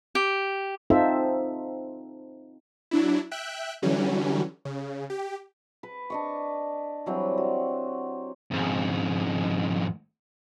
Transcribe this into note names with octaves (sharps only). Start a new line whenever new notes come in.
G4
C4 D#4 F4 A4 C5 E5
F#3 D4 E4
E5 G5 F#6
D3 E3 F#3 G3 C#4
C#3
G4
B4
D4 D#5 C#6
E3 F#3 G3 C4
F#4
F2 G#2